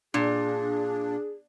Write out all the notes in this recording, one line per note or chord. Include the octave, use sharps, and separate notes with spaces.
A#2 D4 G#4